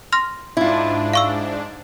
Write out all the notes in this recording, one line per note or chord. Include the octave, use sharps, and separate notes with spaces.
C6 F6 A#6
G#2 D4 E4 F4
F5 C#6 E6